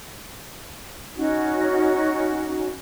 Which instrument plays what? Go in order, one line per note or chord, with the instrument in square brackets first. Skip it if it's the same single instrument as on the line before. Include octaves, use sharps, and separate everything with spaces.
[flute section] C#4 D#4 F#4